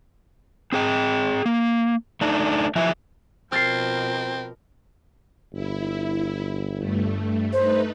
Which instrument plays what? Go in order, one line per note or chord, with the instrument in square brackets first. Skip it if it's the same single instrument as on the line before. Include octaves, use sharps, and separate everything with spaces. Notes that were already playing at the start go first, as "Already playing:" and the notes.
[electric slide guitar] C4 G#4 G5
A#3
A3 D4 D#4
F3 F#3 E4 G#4 E5
[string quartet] B2 F3 A#4 [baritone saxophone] C4 [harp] F6 A6 C7
[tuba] G1 [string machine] E4
[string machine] G2 A3
[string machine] A3 D#4 B4 [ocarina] C5